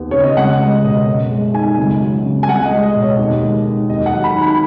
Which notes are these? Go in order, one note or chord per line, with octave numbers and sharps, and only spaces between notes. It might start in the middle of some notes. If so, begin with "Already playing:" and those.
Already playing: D#2 B3
C#3 C#5
D#5
C#2 F#5
G#3 D#5
B2 D#5
F#2
G#3
D#3 G#5
C#2
F#3
C#3
G#5
C#2 F#5
D#5
G#3
D#5
B2
C#5
D#2 D#5
G#3
D#3
D#2 D#5
F#5
F#3
B5
D#3
B5